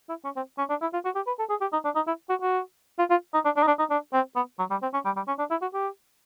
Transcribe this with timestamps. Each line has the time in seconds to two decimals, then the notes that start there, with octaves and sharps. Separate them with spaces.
0.09 E4
0.24 C#4
0.36 C4
0.58 C#4
0.69 D4
0.81 E4
0.93 F4
1.05 F#4
1.15 G4
1.27 B4
1.39 A4
1.50 G#4
1.61 G4
1.72 D#4
1.85 D4
1.95 D#4
2.07 E4
2.30 F#4
2.42 F#4
2.99 F4
3.10 F4
3.34 D#4
3.45 D4
3.57 D4
3.63 D#4
3.67 D4
3.79 D#4
3.90 D4
4.13 C4
4.36 B3
4.59 F#3
4.70 G3
4.82 C4
4.93 C#4
5.05 G3
5.16 G3
5.28 C#4
5.39 D4
5.50 E4
5.61 F#4
5.74 G4